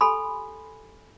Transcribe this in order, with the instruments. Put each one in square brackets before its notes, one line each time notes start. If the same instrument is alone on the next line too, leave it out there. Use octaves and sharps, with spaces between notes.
[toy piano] G4 A4 G#5 B5 C6